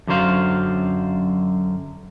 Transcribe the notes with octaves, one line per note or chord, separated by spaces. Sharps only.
F#2 D3 F#3 C5 F5